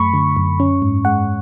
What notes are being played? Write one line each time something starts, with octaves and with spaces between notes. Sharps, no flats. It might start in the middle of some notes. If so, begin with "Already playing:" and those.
Already playing: F#2 A3 B5 C#6
D3
F#2
C#4
G#2
G#3 F#5